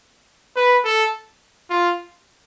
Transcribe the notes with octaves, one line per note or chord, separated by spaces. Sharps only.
B4
A4
F4